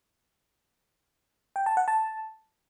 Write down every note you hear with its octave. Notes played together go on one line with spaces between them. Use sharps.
G5
A5
F#5
A5